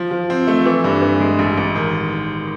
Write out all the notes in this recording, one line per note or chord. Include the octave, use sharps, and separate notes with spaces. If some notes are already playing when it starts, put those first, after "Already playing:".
Already playing: F3
F3
C4
A3
E3
G2
E3
G#3
A1
A1
D#3